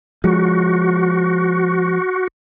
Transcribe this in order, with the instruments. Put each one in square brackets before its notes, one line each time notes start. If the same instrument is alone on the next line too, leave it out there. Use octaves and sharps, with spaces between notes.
[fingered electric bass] F3 G#3 [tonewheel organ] F#4